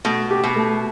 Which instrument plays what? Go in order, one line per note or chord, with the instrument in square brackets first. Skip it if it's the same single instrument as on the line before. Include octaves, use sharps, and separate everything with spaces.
[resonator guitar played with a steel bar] B2 [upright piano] A3
[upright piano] G4
[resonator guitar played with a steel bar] B2
[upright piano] A3